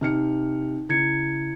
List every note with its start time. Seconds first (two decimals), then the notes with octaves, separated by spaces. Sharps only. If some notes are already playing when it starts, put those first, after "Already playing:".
0.01 C3 D#4 F6 C#7
0.89 C#3 E4 G#6 C#7